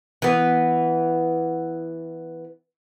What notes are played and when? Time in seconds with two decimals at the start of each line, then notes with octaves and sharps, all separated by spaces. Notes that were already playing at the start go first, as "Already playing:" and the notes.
0.22 E3 B3